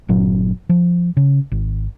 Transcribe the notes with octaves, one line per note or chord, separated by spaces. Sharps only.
G1 A#2 F#3 C#4
F3
C#3
G#1